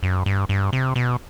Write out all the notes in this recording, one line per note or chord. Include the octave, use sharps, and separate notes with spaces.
F#2
G2
G2
C3
B2